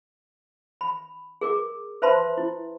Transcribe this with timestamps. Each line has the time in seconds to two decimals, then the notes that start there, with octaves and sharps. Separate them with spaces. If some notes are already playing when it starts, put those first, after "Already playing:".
0.81 B5
1.41 G#4 A#4 D6
2.02 B4 C5 E5 A5 B5 C6
2.37 E4